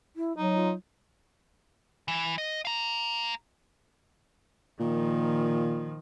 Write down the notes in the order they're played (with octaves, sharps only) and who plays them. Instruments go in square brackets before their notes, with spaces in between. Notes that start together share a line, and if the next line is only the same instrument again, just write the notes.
[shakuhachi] E4
[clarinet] F#3 [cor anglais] D#4 [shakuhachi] D#5
[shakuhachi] F4
[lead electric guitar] E3
D#5
F5 A#5
[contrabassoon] A#2 [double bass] D#3 F3